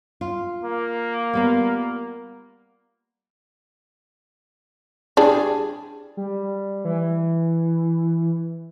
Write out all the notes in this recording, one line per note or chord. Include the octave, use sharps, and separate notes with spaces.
F4
A#3
G3 B3 F4
G3 D4 G#4
G3
E3